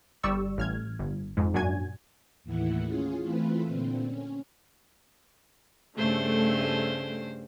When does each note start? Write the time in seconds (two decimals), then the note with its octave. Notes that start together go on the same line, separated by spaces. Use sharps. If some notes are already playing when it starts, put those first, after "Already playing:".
0.23 G1 G3 D5 C#6 E6
0.58 A1 F6 G#6
0.99 G1
1.37 F2 G#2
1.54 F#2 A#2 D4 F#4 G#5 G#6
2.44 D#2 A2 E3 E4 F#5
2.86 C#4 F4 G#4
3.22 E3 A3 C4 F4 B4
3.67 A#2 D3 C4
4.06 C#4
5.98 G2 C#3 A3 C5